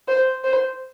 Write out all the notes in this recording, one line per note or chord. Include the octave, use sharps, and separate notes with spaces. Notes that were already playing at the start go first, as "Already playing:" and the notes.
C5
C5